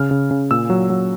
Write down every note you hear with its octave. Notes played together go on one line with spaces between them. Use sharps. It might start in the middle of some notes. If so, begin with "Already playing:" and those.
Already playing: C#3 F6
C#3
C#3
A#2 E6
F#3
F#3